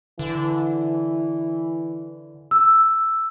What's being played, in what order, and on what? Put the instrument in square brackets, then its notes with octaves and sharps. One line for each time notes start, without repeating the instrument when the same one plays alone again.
[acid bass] D3 [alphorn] E3
[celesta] E6